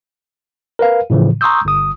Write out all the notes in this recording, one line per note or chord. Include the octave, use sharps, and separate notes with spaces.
A#4 B4 F5
A2 C#3 E3 F3
A#5 C6 C#6 D#6 E6 G6
G1 D#6